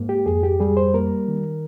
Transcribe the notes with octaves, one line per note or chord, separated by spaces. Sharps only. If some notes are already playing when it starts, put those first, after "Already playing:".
Already playing: G#2 A#3
G4
F2 G#4
G4
G3 G#4
C5
A#3 A#4
D#3